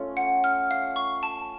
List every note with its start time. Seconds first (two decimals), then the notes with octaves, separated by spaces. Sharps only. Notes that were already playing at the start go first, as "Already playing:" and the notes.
Already playing: A3 C#4 F4
0.17 F#5
0.44 F6
0.71 F5
0.96 C#6
1.23 A5